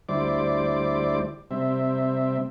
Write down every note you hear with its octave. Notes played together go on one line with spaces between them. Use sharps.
D2 G3 E4 C5 D5 D6
C3 G3 C4 E5